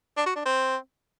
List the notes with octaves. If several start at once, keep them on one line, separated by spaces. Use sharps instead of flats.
D4
F#4
D4
C4